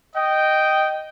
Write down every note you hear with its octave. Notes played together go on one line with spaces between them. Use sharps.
D#5 G5